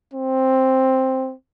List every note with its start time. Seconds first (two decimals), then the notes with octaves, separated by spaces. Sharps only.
0.13 C4